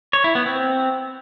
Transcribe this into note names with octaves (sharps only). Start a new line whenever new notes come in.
C#5
E4
B3
C4